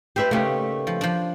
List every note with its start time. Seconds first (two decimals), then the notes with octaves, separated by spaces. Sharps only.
0.16 G4 B4 C5 E5
0.31 C#3 A3 A#3 D#4 G4
0.87 F3
1.01 F3 D4